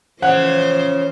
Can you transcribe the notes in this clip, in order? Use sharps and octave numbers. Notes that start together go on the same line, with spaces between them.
C#3 E3 F3 C#4 C5 F#5